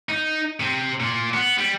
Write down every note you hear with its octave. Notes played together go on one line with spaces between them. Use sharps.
D#4
C3
A#2
B3
G3